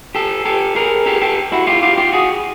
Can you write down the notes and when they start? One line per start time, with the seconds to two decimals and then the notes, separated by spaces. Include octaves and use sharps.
0.15 G4 A4
0.45 G4 A4
0.76 G#4 A#4
1.06 G4 A4
1.21 G4 A4
1.52 E4 F#4
1.67 F4 G4
1.83 F4 G4
1.98 F4 G4
2.13 F#4 G#4